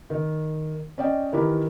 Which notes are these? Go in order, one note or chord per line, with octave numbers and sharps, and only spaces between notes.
D#3
C#4 D5 D#5 G5
D#3 E3 E4 G4 A#4 B4